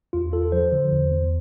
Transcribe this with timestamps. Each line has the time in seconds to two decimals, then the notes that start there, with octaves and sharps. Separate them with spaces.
0.13 E2 F4
0.33 E2 A4
0.52 F3 C5
0.72 D3
0.92 E2
1.11 E2